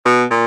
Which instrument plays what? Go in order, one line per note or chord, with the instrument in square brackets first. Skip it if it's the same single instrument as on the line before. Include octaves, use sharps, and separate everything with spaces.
[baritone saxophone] B2
A#2